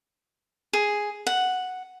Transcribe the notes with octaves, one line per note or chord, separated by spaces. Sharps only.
G#4
F#5